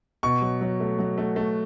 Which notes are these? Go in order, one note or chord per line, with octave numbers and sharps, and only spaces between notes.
B2 C#6
F#3
F#3
A3
F#3
A3
A3